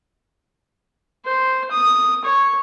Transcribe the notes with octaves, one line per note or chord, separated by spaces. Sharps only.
C5
D#6
C#5